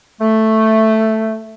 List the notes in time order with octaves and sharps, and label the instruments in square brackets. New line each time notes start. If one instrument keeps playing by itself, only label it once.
[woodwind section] A3